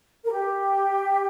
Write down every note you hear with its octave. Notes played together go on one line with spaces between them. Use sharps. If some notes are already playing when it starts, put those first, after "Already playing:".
A#4
G4